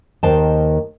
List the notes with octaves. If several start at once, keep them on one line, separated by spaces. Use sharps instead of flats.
D#2 D#3 C5 G5 A5